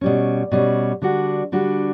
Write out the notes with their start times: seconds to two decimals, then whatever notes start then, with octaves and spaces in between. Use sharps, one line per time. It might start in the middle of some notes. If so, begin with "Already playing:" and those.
0.01 B2 G3 C#4
0.51 B2 G3 C#4
1.02 D3 G3 D4 F#4
1.52 D3 G3 D4 F#4